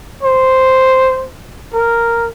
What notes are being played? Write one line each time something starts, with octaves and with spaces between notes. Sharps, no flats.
C5
A#4